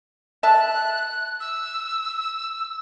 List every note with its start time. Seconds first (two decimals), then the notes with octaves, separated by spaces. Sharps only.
0.43 E5 A5 F#6
1.40 E6